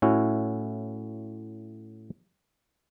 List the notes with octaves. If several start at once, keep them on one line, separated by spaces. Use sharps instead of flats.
A2 C#4 E4 F#4